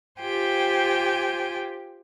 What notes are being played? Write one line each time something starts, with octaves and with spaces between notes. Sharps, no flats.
F4 G4 C5 G5 G#5